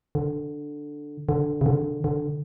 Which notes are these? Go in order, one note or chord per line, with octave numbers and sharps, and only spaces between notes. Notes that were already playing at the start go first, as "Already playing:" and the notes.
D3
D3
C#3
D3
D3